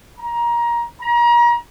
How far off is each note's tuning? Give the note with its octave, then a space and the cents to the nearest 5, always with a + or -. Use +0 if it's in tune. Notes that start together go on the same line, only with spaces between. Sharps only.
A#5 +20
A#5 +35